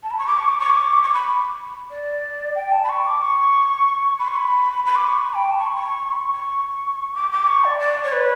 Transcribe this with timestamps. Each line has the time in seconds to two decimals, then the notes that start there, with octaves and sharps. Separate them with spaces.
0.03 A5
0.11 B5
0.18 C#6
0.27 D6
0.37 C#6
0.49 D6
0.60 C#6
0.70 D6
0.81 C#6
0.93 D6
1.03 C#6
1.14 B5
1.91 D5
2.55 G5
2.72 A5
2.84 B5
2.89 C#6
3.06 D6
3.22 C#6
4.19 B5
4.28 C#6
4.36 B5
4.86 B5
4.96 D6
5.07 C#6
5.17 B5
5.34 G5
5.51 A5
5.58 C#6
5.67 B5
5.75 C#6
6.12 B5
6.16 C#6
6.32 C#6
7.14 D6
7.32 D6
7.47 C#6
7.64 D5
7.79 D5
8.04 C#5
8.12 B4